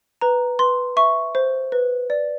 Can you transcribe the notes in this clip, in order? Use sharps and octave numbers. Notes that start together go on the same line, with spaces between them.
B4 A#5
B4 C6
E5 C#6
C5
B4
D5